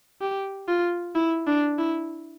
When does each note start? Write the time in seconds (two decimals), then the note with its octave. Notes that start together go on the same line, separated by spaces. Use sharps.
0.21 G4
0.68 F4
1.15 E4
1.47 D4
1.78 E4